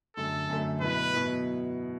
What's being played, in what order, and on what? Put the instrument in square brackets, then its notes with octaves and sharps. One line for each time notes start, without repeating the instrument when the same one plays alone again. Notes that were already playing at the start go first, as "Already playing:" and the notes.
[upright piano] F#2 D3 A3 [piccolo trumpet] A4
[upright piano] F#2 D3 A3
[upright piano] B2 F#3 B3 E4 [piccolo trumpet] B4
[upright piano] B2 F#3 B3 E4